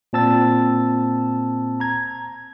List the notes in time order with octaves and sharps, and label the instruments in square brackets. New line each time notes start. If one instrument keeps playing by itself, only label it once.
[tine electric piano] A#2 C4 A5 E6 A6
A#5 G#6